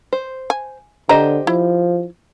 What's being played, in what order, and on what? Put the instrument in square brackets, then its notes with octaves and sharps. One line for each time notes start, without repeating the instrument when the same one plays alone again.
[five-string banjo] C5
[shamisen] G#5
[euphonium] D3 [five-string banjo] G4 C5 D#5 [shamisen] A#5
[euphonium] F3 [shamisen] E4